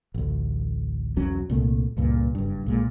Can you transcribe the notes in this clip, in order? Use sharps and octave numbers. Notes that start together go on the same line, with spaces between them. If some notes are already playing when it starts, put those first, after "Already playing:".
A1 D2
B1 E2 F#3 C#4
C2 A#2 A3
C#2 G2 A#2
F#1 G2
B1 A#2 G#3